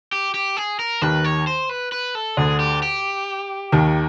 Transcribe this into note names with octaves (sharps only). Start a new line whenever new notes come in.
G4
G4
G#4
A#4
D#2 D#3 B4
C#5
C5
B4
B4
A4
D2 D3 G#4
G4
G4
D#2 D#3